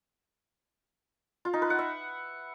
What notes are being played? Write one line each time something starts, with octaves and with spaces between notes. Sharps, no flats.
F4
D#4
B4
F#5
E5